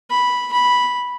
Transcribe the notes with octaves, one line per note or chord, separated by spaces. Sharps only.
B5
B5